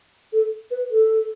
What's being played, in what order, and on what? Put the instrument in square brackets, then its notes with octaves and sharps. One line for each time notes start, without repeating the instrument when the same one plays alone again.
[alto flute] A4
B4
A4